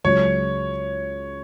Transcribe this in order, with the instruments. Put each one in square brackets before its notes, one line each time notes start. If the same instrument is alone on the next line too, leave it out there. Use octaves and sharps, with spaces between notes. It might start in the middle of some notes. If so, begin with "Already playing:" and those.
[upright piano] C#2 C#3 F#3 [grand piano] C#5